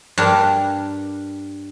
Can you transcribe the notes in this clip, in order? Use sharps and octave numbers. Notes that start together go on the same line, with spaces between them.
G2 D4 A#4 D5 A#5